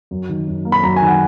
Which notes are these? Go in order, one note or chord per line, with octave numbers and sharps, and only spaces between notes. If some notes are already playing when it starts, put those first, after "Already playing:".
F#2
D#3
F#2
A#3
B5
F#2 A#5
G#5
D#3
F#5